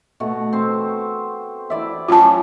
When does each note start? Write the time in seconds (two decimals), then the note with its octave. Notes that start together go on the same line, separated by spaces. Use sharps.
0.20 B2 A3 F#4
0.53 C4 C5
1.70 E4 D5 E5
2.08 F#3 C#4 F4 A5